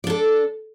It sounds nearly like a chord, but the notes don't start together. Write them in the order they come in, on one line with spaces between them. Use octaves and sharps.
D5 D4 A4